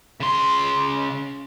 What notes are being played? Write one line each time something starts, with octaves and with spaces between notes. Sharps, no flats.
C#3 C6